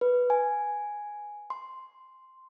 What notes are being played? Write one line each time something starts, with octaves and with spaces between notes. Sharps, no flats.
B4
G#5
C6